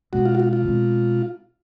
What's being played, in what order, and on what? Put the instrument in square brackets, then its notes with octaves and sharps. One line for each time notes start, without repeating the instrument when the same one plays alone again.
[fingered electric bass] B2 G#3 C4 [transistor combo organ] F#4
[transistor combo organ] F4
F#4
F4
F4
[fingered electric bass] B2 G#3 C4